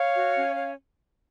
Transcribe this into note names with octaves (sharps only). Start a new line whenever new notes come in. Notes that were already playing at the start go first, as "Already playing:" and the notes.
Already playing: C#5 F5
F#4
C#4
C#5